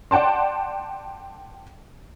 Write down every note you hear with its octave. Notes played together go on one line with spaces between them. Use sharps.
D5 F#5 G5 A5 C6